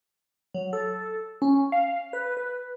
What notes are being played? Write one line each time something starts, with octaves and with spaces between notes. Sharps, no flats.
F#3
A4
C#4
F5
B4
B4